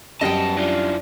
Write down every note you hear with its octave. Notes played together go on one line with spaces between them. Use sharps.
F#2 G3 B3 D#5 G5 A5 A#6
E3 D4 F4